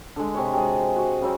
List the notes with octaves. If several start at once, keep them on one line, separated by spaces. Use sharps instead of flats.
D3 G#3
C3 C#5
C3 G#3 F#4 G#4
F#4 G#4
C#3 F#3 C4